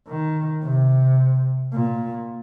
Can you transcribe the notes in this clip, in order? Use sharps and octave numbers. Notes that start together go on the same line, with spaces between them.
D#3
C3
A#2